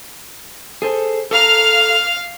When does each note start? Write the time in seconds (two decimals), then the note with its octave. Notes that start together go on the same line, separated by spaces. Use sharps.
0.82 G#4 A4 C5
1.31 A4 F5 A#5 F6